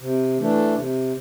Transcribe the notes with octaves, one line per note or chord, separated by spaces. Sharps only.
C3
E3 A3 D4
C3